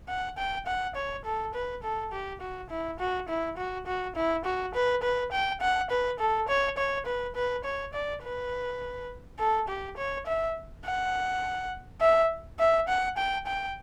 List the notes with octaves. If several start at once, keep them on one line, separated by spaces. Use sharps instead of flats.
F#5
G5
F#5
C#5
A4
B4
A4
G4
F#4
E4
F#4
E4
F#4
F#4
E4
F#4
B4
B4
G5
F#5
B4
A4
C#5
C#5
B4
B4
C#5
D5
B4
A4
G4
C#5
E5
F#5
E5
E5
F#5
G5
G5